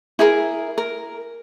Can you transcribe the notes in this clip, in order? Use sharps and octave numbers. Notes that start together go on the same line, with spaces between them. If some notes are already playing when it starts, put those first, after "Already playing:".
E4 G#4 A#4
A#4